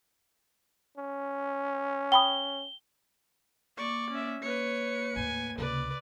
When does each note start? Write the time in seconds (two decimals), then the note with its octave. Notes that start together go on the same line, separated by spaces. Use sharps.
0.98 C#4
2.12 G5 B5 D#6 G7
3.78 A#3 D5 C#6
4.11 C#4 E5
4.42 A#3 B4 C#5 C#7
5.16 D#2 A2 G#5
5.58 C#2 C3 B4 D5